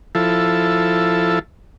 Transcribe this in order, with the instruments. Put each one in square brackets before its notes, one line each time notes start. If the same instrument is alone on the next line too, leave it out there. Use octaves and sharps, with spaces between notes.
[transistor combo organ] F3 E4 A4